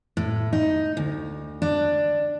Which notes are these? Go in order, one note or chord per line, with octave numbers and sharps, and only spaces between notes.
A2
D#4
D2
D4